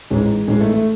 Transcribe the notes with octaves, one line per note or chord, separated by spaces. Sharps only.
A1 G#2 E3 G#3
A1 G#2 E3 G#3
A3
A3